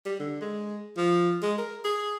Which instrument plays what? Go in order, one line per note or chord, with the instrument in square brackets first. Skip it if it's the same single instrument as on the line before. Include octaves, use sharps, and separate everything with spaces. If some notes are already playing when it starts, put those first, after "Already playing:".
[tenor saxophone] G3
D3
G#3
F3
G#3
A#4
G#4